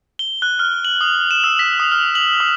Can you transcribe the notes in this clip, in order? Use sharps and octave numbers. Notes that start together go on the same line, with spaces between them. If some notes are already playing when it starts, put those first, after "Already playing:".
G7
F#6
F6
F#7
D#6
E7
E6
B6
D#6
F6
F#7
D#6